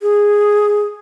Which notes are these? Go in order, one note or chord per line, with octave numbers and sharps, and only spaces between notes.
G#4